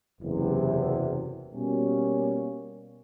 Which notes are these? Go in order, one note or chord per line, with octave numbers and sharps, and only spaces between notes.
F#1 E2 C3
B2 G3 A#3 C#4